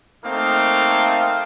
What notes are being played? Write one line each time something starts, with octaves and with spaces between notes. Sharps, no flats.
A3 A#3 C4 D#4 F5